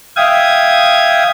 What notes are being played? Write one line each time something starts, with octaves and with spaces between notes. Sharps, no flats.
E5 F5 G5 D#6 G#6